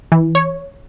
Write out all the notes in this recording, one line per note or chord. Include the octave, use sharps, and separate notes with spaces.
E3
C#5